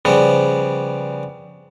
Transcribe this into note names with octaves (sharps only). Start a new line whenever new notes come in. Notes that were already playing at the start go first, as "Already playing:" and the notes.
C#3 F3 G3 B3